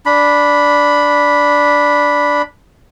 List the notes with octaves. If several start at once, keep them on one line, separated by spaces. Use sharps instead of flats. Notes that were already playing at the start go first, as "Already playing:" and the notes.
D4 B5